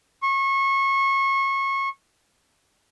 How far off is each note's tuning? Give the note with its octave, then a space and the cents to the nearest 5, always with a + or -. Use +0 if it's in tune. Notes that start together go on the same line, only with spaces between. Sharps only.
C#6 -25